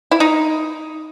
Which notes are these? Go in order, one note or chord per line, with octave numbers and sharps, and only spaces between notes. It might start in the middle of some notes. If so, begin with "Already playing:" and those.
E4
D#4